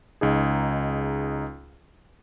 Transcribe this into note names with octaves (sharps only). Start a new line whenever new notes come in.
C#2 D#4 G#4